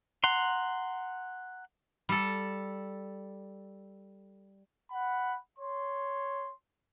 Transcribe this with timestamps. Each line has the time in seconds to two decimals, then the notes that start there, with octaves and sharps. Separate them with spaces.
0.24 F#5 A#5 C6
2.09 G3 A4
4.91 F#5 B5
5.59 C#5 C6